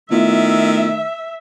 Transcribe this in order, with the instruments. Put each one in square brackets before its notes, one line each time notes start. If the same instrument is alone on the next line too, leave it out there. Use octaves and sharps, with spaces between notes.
[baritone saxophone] D#3 [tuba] A3 [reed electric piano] B3 E4 F4 [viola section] E5